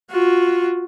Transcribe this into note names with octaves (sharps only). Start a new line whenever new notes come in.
F4 F#4